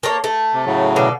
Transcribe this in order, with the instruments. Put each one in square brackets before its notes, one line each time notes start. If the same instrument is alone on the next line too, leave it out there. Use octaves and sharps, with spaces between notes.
[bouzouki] A#3 A4 C#5
A3
[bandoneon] C3
A2 C#3 F#3
[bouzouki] B2 D3 F5